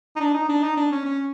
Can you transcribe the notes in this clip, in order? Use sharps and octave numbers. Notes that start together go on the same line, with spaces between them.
D#4
D4
D#4
D4
D#4
D4
C#4
C#4